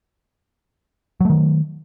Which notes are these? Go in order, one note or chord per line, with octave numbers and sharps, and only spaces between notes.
D#3 F#3 A3